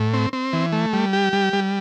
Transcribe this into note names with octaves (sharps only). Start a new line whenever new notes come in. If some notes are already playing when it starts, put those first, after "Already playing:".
Already playing: A2
C4
C4
E3
A3
G3
G4
G3
G3